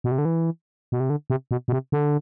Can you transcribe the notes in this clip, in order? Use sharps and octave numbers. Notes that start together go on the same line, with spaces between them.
B2
C3
D3
E3
B2
C3
D3
C3
B2
B2
C3
D3